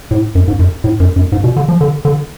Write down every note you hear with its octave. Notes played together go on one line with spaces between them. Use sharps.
A2
F#2
G#2
F#2
A2
F#2
F#2
G#2
B2
D3
F3
D3
D3